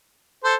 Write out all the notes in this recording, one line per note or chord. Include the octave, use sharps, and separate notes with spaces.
A4 C5